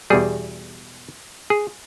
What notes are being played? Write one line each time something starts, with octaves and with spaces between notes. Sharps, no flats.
E2 B2 G3 G#4
G#4